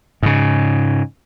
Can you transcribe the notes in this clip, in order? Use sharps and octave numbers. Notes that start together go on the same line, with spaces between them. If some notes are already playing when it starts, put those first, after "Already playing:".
G#2 C#3